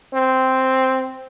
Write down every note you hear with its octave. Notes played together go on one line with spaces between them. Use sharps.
C4